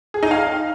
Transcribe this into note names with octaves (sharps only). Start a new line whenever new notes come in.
G#4
D#4
F5